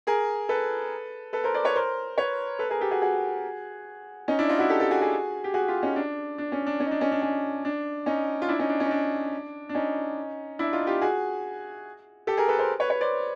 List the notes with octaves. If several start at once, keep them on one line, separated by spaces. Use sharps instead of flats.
G#4 A#4
A4 B4
A4 B4
A#4 C5
C5 D5
B4 C#5
A#4 C5
B4 C#5
A4 B4
G#4 A#4
G4 A4
F#4 G#4
F#4 G#4
C#4 D#4
D4 E4
D#4 F4
E4 F#4
G4 A4
G4 A4
F#4 G#4
F#4 G#4
G4
F#4 G#4
F4 G4
C#4 D#4
D4
D4
C#4
D4
C#4
D#4
D4
C#4 D#4
D4
C#4
D4
C#4 D#4
F4
D4 E4
C#4 D#4
D4
C#4
D#4
D4
D4
C#4 D#4
D4 E4
D#4 F4
F4 G4
F#4 G#4
G4 A4
G#4 A#4
A4 B4
A#4 C5
B4 C#5
B4 C#5
C5 D5